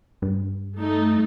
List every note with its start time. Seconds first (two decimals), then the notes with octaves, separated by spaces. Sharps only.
0.22 G2
0.79 A3 D#4